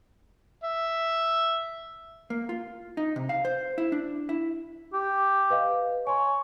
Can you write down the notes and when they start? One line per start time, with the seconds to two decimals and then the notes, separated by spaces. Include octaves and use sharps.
0.64 E5
2.30 A#3
2.49 F4
2.97 D#4
3.16 C3
3.29 F5
3.45 C5
3.78 E4
3.92 D4
4.29 E4
4.93 G4
5.50 B4 D#5 F5
6.07 C#5 G#5 C6